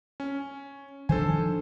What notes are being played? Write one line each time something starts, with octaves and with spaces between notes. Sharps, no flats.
C#4
D#3 F3 D4 A4 C5 G#5